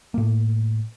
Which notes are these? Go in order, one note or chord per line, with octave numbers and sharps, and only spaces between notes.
A2 A#3